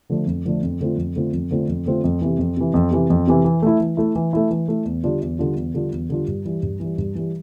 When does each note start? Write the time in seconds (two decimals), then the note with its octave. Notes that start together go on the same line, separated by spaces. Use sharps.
0.10 D3 F3 A3 D4
0.26 F2
0.45 D3 F3 A3 D4
0.63 F2
0.80 D3 A3 C4 F4
0.97 F2
1.16 D3 A3 C4 F4
1.33 F2
1.51 D3 A3 C4 F4
1.68 F2
1.86 D3 A3 C4 F4
2.04 F2
2.22 C3 E3
2.38 F2
2.57 C3 E3
2.74 F2
2.91 C3 E3
3.10 F2
3.27 C3 E3
3.45 E3
3.62 A3 E4
3.80 E3
3.97 A3 E4
4.15 E3
4.33 A3 E4
4.51 E3
4.68 A3 E4
4.85 E2
5.03 D3 G3 D4 F4
5.22 E2
5.39 D3 G3 D4 F4
5.56 E2
5.74 D3 G3 D4 F4
5.92 E2
6.09 D3 G3 D4 F4
6.27 G2
6.45 E3 G3
6.62 G2
6.80 E3 G3
6.98 G2
7.15 E3 G3